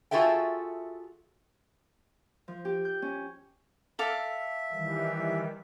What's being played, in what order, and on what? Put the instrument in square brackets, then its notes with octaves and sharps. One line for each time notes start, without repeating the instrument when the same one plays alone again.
[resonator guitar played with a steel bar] F4 F#4 G#4 A4 E5 G5
[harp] F3
G4
G6
C#4
[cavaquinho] A4 F5 D6 [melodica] E5
[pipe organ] D#3 E3 G3